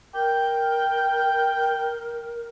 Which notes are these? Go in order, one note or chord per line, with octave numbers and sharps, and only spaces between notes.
A#4 G5